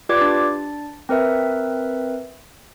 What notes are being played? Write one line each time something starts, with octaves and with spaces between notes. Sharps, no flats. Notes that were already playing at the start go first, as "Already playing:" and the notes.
F4 G4 B4 D5 D6 G#6
D4 A6
C4 A#4 B4 E5